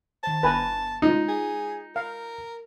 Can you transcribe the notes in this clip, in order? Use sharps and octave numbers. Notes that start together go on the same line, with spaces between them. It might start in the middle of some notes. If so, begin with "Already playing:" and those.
D#3 C5 A5
G1 B4 G#5 A#5 C#6
G#3 D#4 F4
G#4
A#4 F5